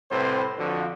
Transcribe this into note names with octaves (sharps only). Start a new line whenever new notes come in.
C2 A2 C3 C4 B4 C5
F2 D3 F3 F#4